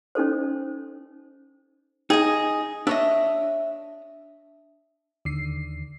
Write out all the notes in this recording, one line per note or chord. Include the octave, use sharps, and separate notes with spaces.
C#4 D#4 A4 C5
D#4 G#4 D#5
D4 C#5 D#5 E5
D#2 D3 C7